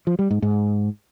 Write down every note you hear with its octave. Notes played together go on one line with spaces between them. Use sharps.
F3
G3
G#2
G#2